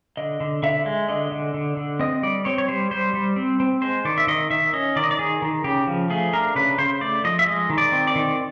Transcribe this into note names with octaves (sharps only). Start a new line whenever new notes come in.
D3 D#5
D3
D3 E5
G#3
D3 D#5
D3
D3
D3
C4 D#5
G3 D5
C4 C#5
C#5
G3 C5
G3 C5
G3
C4
C4
G#3 C5
D#3 D5
E5
D#3 D#5
D#3 E5
C#4 D#5
D#3 D5
D#5
D5
D#3 G#4
D#3
C#3 G4
F3
A3 G#4
D4 A#4
C#3 B4
C#3 C5
A3 D5
F3 D#5
E5
G#3 D#5
D#3
D5
C4
D5
D#3